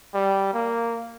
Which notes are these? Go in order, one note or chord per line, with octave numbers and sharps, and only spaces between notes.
G3
A#3